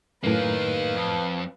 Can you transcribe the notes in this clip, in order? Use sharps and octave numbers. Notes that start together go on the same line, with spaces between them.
F#2 A2 D#3 A#3 B4 F5
F2